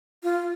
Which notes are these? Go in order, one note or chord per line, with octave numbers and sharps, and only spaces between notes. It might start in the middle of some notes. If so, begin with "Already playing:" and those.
F4